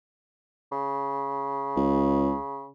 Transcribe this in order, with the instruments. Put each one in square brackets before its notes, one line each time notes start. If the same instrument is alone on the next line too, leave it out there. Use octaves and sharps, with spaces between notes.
[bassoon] C#3
[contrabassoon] C#2